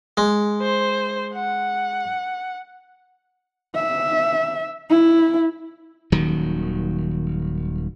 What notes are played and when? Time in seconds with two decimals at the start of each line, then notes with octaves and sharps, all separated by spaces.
0.17 G#3
0.62 C5
1.34 F#5
3.75 E5
4.90 E4
6.12 D#1 D#3 F#3